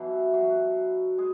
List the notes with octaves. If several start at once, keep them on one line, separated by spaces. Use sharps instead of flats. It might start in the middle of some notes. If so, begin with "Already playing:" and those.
Already playing: B2 E3 F#3 E4
F#3 F#4
G#3 G#4